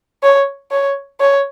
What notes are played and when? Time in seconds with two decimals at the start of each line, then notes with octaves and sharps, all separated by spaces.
0.23 C#5
0.72 C#5
1.20 C#5